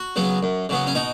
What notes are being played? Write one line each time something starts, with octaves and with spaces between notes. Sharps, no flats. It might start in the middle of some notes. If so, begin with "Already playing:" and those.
Already playing: F#4
C#3 F#3 B3
F#2
C#3 F#3 B3
C#4
B2 D#4